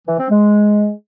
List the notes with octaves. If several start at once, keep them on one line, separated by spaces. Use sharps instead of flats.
E3
C4
G#3